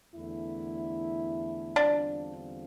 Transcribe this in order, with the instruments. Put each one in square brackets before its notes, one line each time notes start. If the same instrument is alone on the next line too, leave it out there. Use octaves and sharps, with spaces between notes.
[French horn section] E2 D3 A3 E4
[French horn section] E2 D3 G3 C4 F4 [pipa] D4